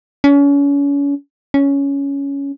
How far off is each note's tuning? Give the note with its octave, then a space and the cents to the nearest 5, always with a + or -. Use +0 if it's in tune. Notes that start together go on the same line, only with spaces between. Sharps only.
C#4 +35
C#4 +10